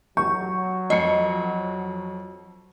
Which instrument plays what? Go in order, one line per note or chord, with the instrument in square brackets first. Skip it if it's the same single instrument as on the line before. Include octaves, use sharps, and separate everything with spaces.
[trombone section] F#3 [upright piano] C#6 [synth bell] G6
[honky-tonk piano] F2 C7 C#7 [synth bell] D#5